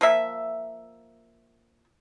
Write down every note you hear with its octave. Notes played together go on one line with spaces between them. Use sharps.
F3 A#3 E5